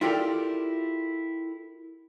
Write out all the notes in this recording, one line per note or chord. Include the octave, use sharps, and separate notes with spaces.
E4 F4 G4 A4 A#4 D5